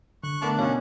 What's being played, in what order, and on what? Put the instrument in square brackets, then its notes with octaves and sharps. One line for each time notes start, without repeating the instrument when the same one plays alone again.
[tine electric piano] D3 [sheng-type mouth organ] C#6 F#6
[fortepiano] A3 B3 A#4 [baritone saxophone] D4
[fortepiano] B2 [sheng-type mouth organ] C#4 [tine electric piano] C#5 F5